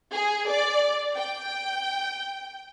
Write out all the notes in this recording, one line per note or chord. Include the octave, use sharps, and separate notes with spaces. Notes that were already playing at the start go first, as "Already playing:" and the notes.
G#4
D5
G5